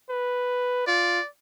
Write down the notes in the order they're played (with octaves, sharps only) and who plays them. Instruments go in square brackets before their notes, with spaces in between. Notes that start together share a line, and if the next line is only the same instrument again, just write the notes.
[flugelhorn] B4
[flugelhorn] F4 [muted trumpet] D5